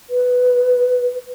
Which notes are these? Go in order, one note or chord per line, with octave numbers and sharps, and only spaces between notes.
B4